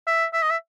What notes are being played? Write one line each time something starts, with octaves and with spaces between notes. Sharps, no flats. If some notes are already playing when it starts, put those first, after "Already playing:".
E5
E5
D#5
E5